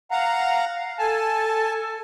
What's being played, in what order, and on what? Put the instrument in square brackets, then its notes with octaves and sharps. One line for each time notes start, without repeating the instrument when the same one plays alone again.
[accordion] F5 F#5 A#5
[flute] F5
[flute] A4 [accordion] G#5 A5